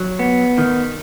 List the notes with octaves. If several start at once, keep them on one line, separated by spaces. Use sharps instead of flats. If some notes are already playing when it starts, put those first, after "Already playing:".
Already playing: F#3
B3
D#3